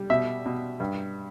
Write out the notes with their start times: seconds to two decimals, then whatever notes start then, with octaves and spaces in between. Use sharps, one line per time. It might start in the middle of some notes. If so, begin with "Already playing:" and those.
Already playing: G3
0.10 B2 E5
0.46 B2
0.80 G2